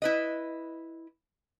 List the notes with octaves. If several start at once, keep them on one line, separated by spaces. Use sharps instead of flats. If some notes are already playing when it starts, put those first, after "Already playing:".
E4 B4 D#5